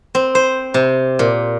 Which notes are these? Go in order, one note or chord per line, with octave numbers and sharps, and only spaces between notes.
C4
C5
C3
A#2